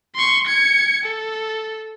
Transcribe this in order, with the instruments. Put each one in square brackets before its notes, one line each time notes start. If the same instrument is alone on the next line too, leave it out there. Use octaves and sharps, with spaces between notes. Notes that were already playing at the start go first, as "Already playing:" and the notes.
[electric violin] C6 C#6
G#6 C#7
A4